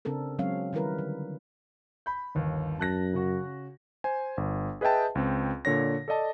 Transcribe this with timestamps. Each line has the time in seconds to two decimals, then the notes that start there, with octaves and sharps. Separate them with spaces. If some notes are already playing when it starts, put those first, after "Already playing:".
0.05 C#3 C4 D4 A4 A#4
0.39 F#3 G#3 C4 C#4 C#5 F5
0.73 D#3 G3 E4 A#4 B4
0.98 D3
2.06 B5 G6
2.35 G1 D#2 D#3
2.79 F#2 A5 F#6 A#6
3.13 C#3 F#4
4.04 C5 G#5
4.37 G1
4.81 G#4 B4 D#5 E5 G5 A5
5.15 C#2 C4
5.65 A#2 D3 C#5 A#6
6.08 A4 D5 D#5 A5